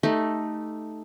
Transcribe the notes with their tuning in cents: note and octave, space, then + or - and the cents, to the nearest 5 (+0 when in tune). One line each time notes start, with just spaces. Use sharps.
A3 +0 D#4 +0 G4 +0